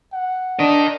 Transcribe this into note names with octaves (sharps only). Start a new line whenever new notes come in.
F#5
D4 A#4 D#5